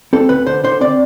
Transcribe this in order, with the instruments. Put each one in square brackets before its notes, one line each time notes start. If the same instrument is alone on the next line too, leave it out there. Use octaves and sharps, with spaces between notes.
[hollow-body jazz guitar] C4 A4
D2 B4
D3 C5
D3 C5
C4 D5